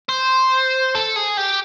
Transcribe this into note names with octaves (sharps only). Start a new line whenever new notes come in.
C5
A4
G#4
G4